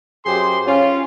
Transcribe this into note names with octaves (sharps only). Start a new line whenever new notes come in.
F#2 G4 G#4 C5 C6
C#4 F4